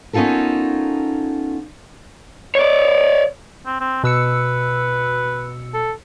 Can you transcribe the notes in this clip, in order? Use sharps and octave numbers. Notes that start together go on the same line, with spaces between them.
B3 C#4 D#4 F4 A4 A#4
C#5 D5
C4
C4
B2 B4 E6 C#7
A4